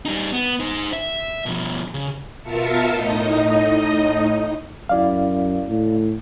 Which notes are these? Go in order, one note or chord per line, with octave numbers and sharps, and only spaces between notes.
G3 D#4
B3
D#4 C5
E5
B2 F3
C#3
B2 F4 A#4 E5 A5 C#7
A2 D#4 D#5
F#2 E4 D5 F5
A2